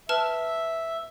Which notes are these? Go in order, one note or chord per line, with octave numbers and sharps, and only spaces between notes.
B4 E5 A5 F6